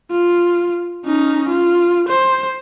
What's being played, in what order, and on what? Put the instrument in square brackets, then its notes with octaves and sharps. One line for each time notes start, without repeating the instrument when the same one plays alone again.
[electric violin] F4
C#4 D#4
F4
C5